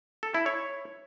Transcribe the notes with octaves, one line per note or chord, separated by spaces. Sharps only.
A4
E4
C#5